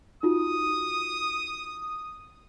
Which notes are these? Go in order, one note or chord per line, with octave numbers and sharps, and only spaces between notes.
D#4 F4 F#4 D#6